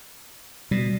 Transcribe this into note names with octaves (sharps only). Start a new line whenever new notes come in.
B2 G3